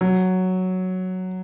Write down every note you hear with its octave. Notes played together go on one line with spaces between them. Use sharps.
F#3